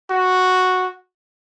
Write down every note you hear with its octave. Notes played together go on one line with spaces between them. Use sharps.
F#4